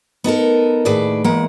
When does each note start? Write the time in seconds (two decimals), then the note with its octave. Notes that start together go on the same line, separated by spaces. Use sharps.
0.24 B3 D#4 A4 A#4
0.85 D#2 A2 G#4 B4 D5
1.24 E2 G#3 A#3 F#5